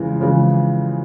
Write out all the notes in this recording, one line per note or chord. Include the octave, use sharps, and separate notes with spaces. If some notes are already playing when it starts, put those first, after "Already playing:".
Already playing: F2 C#3 E3 G#3
F2 C#3 E3 G#3